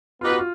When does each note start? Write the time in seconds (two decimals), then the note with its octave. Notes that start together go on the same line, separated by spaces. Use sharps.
0.21 B3 D#4 F4 G4 B4
0.30 F#4
0.39 F4